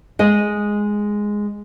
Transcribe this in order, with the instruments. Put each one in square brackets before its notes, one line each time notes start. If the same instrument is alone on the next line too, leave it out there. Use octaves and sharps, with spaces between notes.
[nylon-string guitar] G#3 D#5